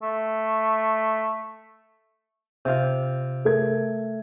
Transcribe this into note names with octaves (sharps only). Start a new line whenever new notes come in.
A3
C3 F4
A3 A#4 G#6